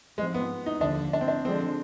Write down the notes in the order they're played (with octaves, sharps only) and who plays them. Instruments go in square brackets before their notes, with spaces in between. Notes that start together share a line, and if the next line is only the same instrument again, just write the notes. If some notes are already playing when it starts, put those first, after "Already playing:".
[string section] G#2 F3 C4 [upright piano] G#3
[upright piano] B3
D#4
[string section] D#2 D3 F3 [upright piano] D4
[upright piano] D4
C4
D4
[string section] D3 F3 G#3 D4 [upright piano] C4